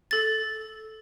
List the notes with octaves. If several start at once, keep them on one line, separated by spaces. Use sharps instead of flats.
A4 A6